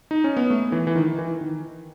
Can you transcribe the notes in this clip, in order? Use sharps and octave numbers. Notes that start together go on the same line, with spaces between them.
D#4
C#4
B3
A3
E3
E3
D#3
E3
D#3